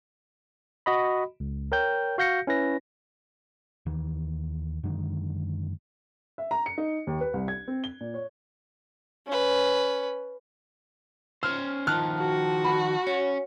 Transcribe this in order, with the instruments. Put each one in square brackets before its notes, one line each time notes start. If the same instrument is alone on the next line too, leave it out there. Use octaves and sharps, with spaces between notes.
[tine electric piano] F#4 D#5 B5
C#2
A#4 C#5 G5 G6
F#4 F5 G6 A#6 C#7
C#4 E4 B4 A#6
[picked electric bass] D#2 D#3 E3
F#2 D3 D#3 G#3
[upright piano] E5
A#5
C#7
D#4
D#2
B4
C2
G#6
C4
G7
A#2
C#5
[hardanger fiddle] C#4 B4
[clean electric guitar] C#4 C5 [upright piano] F6
[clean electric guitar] D#3 F3 [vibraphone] A5 [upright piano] F6 F#6
[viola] F#4
[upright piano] B5
[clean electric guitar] C#4 [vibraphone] C#5